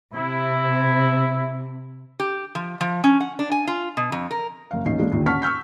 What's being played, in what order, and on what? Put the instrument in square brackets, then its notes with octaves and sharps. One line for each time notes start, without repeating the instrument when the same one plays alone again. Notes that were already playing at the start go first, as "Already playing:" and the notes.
[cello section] C3 [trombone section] E4
[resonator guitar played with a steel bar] G4
F3
F3
C#4
F#5
D4
G#5
F4
B2
F2
A#4
[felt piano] F#1 F5
D#1 A1 C#4 D#4 C7
E3 G#3 A#3 D4
D#2 A#2 D3 D#3
C#4 F#5 A5 C#6 F6 B6
C#6 E6 F6 G6 B6